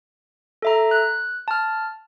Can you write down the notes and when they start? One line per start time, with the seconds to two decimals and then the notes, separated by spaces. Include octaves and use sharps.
0.62 A4 E5 A#5
0.91 F#6
1.48 A5 F6